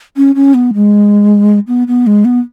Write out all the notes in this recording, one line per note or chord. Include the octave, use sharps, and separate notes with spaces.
C#4
C#4
B3
G#3
B3
B3
G#3
B3